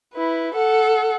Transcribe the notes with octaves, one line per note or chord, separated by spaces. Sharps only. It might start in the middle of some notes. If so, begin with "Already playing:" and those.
E4 B4
A4 F#5